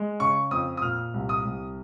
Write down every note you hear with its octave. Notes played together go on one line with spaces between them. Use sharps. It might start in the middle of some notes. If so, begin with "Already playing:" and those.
Already playing: G#3
C#3 C#6
F2 D#6
D#6
A#2 F6
C2
D#6
C2